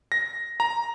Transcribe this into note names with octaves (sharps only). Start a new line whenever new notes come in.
A#6
A#5